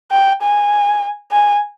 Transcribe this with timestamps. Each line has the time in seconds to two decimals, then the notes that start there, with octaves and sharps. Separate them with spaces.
0.11 G5
0.42 G#5
1.32 G#5